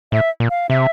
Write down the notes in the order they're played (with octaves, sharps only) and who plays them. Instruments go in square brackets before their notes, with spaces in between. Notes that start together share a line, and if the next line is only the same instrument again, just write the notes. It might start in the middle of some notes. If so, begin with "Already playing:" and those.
[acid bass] A2 [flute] E5
[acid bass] A#2
[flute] F5
[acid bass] C3 [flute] E5